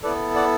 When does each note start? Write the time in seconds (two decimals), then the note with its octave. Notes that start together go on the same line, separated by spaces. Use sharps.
0.03 B3 E4 A4 B4 D5
0.35 D5 F#5